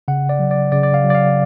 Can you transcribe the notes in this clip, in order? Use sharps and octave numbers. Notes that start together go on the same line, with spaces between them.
C#3 F#5
D5
F#3
D5
C#3 D5
D5
F5
F#3
D5
F5